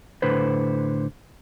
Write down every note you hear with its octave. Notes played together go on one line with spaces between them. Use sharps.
A2 D3 B4 C5